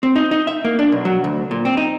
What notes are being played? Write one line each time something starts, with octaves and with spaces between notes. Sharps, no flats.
C4
D#4
D#4
E5
A#3
D4
B1
F#3
D2
A#2
C4
D#4